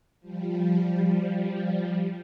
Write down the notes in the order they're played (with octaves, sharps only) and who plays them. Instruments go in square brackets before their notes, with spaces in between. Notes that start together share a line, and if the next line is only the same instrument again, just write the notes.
[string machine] F3 G3